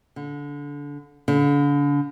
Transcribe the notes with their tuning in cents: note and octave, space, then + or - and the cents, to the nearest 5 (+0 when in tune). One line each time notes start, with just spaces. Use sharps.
D3 -25
D3 -40